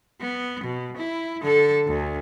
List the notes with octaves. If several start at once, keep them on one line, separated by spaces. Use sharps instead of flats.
B3
B2
E4
D3 A4
D2